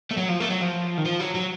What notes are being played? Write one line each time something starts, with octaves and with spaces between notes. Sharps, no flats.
A3
F#3
F3
A3
F#3
F3
D#3
F3
F#3
F#3